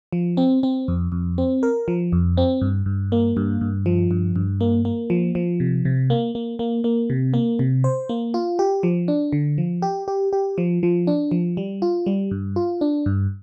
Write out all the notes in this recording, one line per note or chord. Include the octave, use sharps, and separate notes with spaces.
F3
C4
C4
F2
F2
C4
A#4
F3
F2
C4
G2
G2
A#3
G2
G2
F3
G2
G2
A#3
A#3
F3
F3
C3
C3
A#3
A#3
A#3
A#3
C3
A#3
C3
C5
A#3
F4
G4
F3
D4
D3
F3
G4
G4
G4
F3
F3
D4
F3
G3
F4
G3
G2
F4
D4
G2